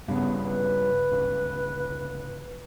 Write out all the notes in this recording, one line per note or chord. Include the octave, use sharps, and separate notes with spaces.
G2 C#3 B3
B4
G1 C#2